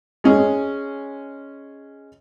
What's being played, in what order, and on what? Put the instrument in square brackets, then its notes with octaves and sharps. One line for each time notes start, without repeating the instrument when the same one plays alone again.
[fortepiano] G#3 C#4 G#4